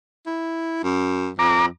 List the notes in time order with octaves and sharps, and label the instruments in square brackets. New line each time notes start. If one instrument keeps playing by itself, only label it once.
[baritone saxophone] E4
F#2
[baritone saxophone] F2 [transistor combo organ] A#5 D6